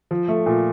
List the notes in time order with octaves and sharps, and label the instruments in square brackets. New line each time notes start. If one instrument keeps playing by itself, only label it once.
[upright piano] F3
A3
A#2